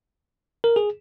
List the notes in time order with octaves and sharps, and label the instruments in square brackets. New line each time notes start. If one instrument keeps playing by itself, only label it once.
[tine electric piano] A#4
G#4